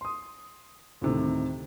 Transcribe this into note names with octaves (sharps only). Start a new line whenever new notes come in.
C6 D#6
D2 A2 C3 D#3